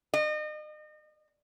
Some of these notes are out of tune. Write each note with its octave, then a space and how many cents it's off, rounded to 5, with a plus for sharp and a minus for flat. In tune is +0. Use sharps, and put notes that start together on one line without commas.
D#5 -35